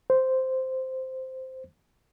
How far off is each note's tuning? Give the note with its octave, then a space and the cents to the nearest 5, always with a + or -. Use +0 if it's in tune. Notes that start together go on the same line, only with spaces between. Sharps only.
C5 -5